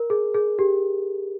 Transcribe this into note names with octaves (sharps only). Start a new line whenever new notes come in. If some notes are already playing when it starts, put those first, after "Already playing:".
Already playing: A#4
G#4
G#4
G4